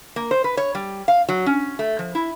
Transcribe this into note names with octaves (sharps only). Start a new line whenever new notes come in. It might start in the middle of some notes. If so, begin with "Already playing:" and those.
A#3
C5
B4
C#5
G3
F5
F#3
C#4
A3
F3
E4